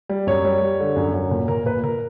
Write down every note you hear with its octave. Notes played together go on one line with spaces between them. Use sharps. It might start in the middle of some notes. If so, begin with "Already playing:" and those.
G3
F#2 C#5
G3
G3
D3
F#2
F#2
A#2
A#2 A#4
A#2 B4
A#2 A#4